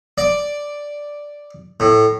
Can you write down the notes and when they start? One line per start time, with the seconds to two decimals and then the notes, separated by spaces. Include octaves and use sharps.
0.18 D5
1.80 A2